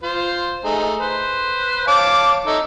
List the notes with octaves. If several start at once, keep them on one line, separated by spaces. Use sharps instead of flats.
F4 C5
A3 D#4 G#4
B4 C5
C#5 F5 A5 D6
D#4 A4 C#5 E5